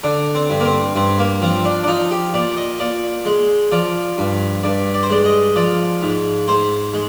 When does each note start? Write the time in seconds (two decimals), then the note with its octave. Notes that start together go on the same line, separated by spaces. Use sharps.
0.04 D3 D4
0.35 C4
0.50 G2
0.60 A#3
0.65 C4
0.96 G2 C4
1.19 A#3
1.42 F3 C4
1.65 D4
1.84 D4
1.87 F3 D#4
2.11 G4
2.34 A#2 D5
2.57 D#5
2.80 A#2 D5
3.25 G#3
3.72 F3 D5
4.18 G2
4.63 G2 D5
4.94 D5
5.03 C5
5.10 G#3 D5
5.25 D#5
5.56 F3 D5
6.02 G#2
6.48 G#2 C5
6.94 G#3